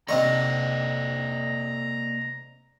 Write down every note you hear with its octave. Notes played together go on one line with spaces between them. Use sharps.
C3 A#3 D#4 A4 D5 A#5 C#6